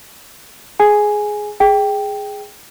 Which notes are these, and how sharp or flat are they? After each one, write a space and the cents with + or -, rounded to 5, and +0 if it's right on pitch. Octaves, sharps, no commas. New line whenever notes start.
G#4 +10 G#5 +0
G#4 +0 G5 +0